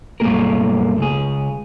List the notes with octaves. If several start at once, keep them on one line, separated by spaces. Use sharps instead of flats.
B1 G2 A3 A#3 G#4 A#4
C#2 G#4